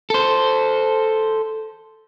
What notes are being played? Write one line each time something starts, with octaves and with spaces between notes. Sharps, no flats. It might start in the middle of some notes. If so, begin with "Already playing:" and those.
A4 C5